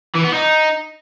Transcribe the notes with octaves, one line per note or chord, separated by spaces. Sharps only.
E3
B3
D#4